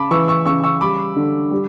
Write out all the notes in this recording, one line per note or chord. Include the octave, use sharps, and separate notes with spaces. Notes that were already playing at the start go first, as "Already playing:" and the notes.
Already playing: C#3 A5 B5 D6
E3 C#6 E6
C#6 E6
C#3 C#6 E6
C#6 E6
G3 B5 D6
D3
G3